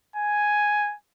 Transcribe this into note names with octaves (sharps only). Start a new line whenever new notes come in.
G#5